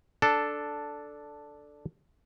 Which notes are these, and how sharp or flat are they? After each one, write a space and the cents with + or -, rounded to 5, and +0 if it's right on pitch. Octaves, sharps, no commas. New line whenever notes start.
D4 +0 A4 +0